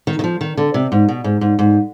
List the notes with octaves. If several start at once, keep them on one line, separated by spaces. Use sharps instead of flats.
D#3
D#3
F3
D#3
D3
C3
G#2
B2
G#2
G#2
G#2